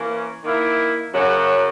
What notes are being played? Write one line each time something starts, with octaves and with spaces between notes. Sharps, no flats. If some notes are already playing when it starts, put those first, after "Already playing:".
Already playing: E3 A#3 C#4
D#3 A#3 E4
F#2 C#3 F#3 C#4 F#4